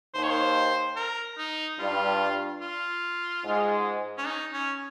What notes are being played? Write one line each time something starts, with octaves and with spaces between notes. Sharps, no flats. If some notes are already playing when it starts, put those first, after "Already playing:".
D#2 D#3 C5
C#5
C5
A#4
D#4
G2 G3 F4
F4
G#2 G#3
C#4
D#4
C#4